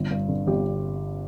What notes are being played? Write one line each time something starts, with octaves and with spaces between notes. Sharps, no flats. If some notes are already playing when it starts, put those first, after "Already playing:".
Already playing: G1
G2
D3
G1 G4